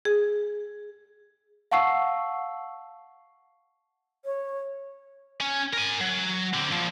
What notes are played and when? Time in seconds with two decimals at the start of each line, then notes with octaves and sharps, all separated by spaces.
0.05 G#4
1.71 F5 F#5 A5 C#6 E6 C7
4.25 C#5
5.41 C#4
5.73 A#4 G#5
6.01 F#3
6.54 D3 C4
6.72 A#2 F3